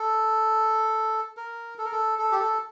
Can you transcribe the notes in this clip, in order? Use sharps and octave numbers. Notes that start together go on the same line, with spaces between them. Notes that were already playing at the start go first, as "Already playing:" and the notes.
Already playing: A4
A#4
A4
A#4
A4
A4
G4
A4